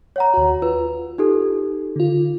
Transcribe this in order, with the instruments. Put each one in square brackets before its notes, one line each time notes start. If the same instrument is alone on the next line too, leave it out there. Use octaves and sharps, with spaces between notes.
[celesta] C#5 F#5 A#5
[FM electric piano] D#2 F#4
[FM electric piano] F4 [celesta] B4
[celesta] D#4 G4 A4
[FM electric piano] D3 F4